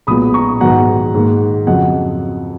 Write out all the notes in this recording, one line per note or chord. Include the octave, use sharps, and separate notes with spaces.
B1 A#2 G#3 B3 B5 D#6
A#5 C#6
G#2 D#3 F#3 B3 F#5 A#5
G#2 D#3 A#3
F2 C#3 F#3 D#5 F#5